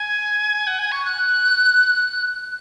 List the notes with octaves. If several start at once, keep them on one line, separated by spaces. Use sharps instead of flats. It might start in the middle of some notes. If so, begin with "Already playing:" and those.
Already playing: G#5
F#5
G#5
C#6
F#6